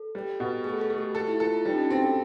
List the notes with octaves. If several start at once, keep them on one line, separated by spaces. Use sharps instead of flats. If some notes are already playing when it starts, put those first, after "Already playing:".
Already playing: A4
G3
B2
A3 G#4
A4
A3
G4
F#4 A4
E4
F4 A4
F4
G3 D#4
C#4
D4
C4 F#4
A4